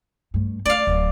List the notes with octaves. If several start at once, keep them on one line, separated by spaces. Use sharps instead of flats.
G2 A3
A3 D5 F5
D1